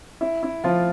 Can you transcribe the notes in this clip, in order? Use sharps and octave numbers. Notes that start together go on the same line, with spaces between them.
E4
E4
F3 F4